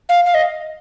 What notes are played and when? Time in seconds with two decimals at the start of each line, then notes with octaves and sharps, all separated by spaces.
0.09 F5
0.26 F5
0.34 D#5